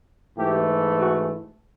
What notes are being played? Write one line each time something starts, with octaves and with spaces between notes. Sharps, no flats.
G#2 E3 A3 G4
F#4